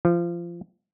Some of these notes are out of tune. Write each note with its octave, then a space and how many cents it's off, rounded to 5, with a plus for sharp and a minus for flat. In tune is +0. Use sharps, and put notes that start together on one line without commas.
F3 -25